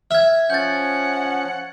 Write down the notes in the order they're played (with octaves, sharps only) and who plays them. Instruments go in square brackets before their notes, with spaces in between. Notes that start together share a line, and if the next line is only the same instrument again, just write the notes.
[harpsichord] E5 [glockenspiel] F6 G#6
[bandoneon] F3 C#4 [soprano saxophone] F#5 [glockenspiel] G6 A6